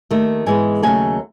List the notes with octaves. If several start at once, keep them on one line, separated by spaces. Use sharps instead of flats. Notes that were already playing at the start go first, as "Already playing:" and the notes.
D#2 D#3 A3
G#2 E3 G#3 B3 G#5
D#2 C#3 F#3 A3 G#5